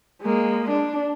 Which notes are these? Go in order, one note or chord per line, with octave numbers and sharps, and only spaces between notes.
G#3 A#3
D4